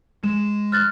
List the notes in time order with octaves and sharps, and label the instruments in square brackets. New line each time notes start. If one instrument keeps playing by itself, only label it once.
[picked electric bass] G#3 [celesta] E7
[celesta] F6 F#6 A6